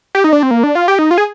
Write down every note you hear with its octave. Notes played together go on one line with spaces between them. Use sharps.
G4
D#4
D4
C4
A#3
D4
F4
G4
D#4
F4
G#4